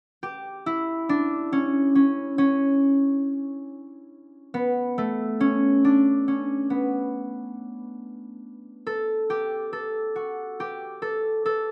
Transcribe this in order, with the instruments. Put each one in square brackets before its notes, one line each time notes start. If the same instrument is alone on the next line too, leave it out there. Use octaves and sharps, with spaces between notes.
[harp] G4
E4
D4
C#4
C#4
C#4
B3
A3
C#4
D4
C#4
B3
A4
G4
A4
F#4
G4
A4
A4